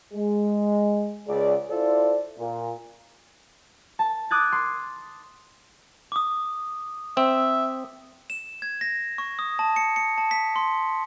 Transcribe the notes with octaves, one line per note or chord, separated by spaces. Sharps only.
G#3
C#2 G#4 D5
E4 F4 A4 C5 D5
A#2
A5
D6 D#6 F#6 G#6 A6
C6
D6 D#6
C4 E5
E7
G#6
A#6
C#6
D#6
A5
C#7
C#7
A5
B6
C6